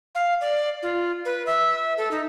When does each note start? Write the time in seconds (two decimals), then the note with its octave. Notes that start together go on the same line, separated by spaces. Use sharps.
0.15 F5
0.41 D5
0.83 F4
1.25 B4
1.46 E5
1.97 A4
2.11 D#4